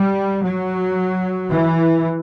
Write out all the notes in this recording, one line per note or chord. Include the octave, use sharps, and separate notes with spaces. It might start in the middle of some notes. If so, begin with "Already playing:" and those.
Already playing: G3
F#3
E3